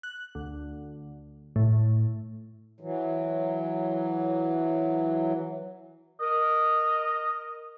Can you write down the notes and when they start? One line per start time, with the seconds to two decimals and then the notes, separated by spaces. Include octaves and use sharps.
0.03 F#6
0.35 D2
1.56 A2
2.80 E3 F#3
6.20 A#4 D#5